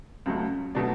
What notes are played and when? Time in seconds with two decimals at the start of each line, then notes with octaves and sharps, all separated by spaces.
0.26 C#2 C#3 F#3 A3
0.75 B2 F#3 A3 D4 D5